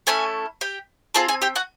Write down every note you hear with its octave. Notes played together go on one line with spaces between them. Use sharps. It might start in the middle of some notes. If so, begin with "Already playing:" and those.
A3 C#4 E4 A4 G#5
G4 G5
C4 F4 G#4 A4 A5
G#4 G#5
G4 G5
F#4 F#5